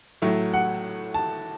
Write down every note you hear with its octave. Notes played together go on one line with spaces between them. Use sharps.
A2 F#3 A3 E4
F#5
A5